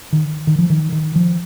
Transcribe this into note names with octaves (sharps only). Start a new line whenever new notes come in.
D#3
D#3
F3
D#3
D#3
F3